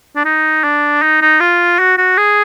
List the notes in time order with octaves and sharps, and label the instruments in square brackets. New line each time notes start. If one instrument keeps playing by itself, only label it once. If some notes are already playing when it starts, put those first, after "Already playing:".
[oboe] D4
D#4
D4
D#4
D#4
F4
F#4
F#4
G#4